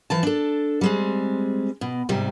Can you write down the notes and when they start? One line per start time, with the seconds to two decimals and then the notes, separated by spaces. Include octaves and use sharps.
0.10 E3 F3 A5
0.23 D4 A4
0.81 G3 G#3 C4
1.81 B2
2.09 G#2 C3 G3